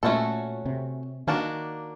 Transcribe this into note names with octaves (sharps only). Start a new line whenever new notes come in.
A#2 A3 C#4 F#4 A4
C3
D#3 A#3 D4 F#4